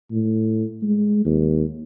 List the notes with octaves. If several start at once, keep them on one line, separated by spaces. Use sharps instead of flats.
A2
G#3
D#2